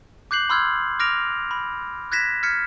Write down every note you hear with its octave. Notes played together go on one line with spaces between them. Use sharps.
D6 F#6 G6 C7 F#7
B5 C6 E6 F6 G6 G#6
D6 F6 A#6 D7 F7
B5
F#6 G#6 A#6 B6 E7
F6 G#6 B6 C#7